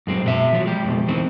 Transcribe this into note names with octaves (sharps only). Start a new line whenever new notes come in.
F#2 G#3 C4
B2 A4 E5
F3 F#3
G#3 G4
F2 B2 F3
E3 G#3 C4 D#4